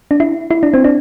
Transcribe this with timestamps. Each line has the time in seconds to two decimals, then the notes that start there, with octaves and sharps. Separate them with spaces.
0.11 D4
0.20 E4
0.51 E4
0.63 D4
0.74 C4
0.84 D4